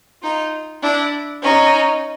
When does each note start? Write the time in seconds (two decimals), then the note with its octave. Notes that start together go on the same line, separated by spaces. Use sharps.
0.23 D#4 F4
0.82 D4 E4
1.42 C#4 D#4